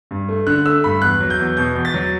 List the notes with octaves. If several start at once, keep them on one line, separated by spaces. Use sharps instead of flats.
G2
A3
D3 F#6
A3 E6
G2 B5
E2 F#6
F#3
G6
E2
B2 G6
E2
A6
F#3